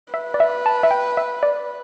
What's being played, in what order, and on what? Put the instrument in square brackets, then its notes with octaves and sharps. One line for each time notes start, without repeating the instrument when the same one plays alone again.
[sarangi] B4 [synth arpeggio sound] E5
[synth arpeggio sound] D5
E5
A5
E5
G5
E5
D5